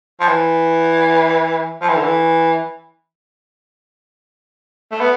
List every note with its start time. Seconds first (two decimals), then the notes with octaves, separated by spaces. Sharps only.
0.21 F3
0.28 E3
1.82 F3
1.89 E3
1.96 D3
2.04 E3
4.91 A3
5.00 B3